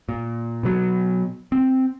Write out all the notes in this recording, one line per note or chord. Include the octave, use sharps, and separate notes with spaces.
A#2
B2 F#3
C4